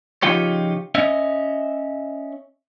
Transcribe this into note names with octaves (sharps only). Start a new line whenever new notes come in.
C#3 F3 D#4 F4 G4 C#5
C#4 D#5 E5